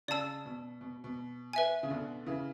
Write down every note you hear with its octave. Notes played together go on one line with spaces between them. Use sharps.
C#3 D5 A5 E6
B2
B2
B2
B4 E5 G#5
C#3
B2 D3
C#3 E3